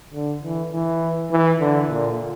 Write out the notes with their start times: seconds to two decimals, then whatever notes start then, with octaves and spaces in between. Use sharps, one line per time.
0.14 D3
0.43 E3
0.72 E3
1.31 E3
1.60 D3
1.90 A#2